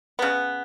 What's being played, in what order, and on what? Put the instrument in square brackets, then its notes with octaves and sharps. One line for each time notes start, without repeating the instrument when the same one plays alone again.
[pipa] C#3 B3